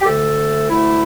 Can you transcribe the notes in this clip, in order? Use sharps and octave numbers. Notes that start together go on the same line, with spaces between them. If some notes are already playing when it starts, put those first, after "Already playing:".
G4
D2 D3 A3 A4
D2 D3 A3 E4